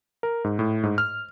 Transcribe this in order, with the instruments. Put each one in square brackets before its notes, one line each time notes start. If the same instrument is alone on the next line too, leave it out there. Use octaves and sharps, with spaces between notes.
[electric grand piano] A#4
G#2
A2
G#2
F6